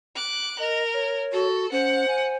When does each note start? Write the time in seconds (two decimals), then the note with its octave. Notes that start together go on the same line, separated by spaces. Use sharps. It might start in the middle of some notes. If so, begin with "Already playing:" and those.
0.16 D6 F#6
0.60 A#4 D#5
0.94 C#5
1.33 F#4 A4
1.72 C#4 C5 F#5
2.08 G#5